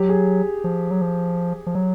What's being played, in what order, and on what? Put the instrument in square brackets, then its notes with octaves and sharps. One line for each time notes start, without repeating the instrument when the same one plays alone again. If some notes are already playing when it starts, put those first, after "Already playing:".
Already playing: [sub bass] F#3 [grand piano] G4
[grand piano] G#4
[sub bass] F3
F#3
F3
F3
F#3